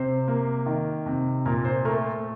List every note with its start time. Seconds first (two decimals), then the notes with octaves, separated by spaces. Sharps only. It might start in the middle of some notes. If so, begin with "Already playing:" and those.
Already playing: C3 C5
0.28 A#3
0.66 D#3
1.06 C3
1.45 A#2 A#4
1.65 C5
1.85 A3 A#4